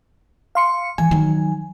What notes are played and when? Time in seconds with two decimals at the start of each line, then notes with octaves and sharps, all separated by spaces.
0.55 F5 C6 C#7
0.98 E3 G#5
1.11 D#3 F#3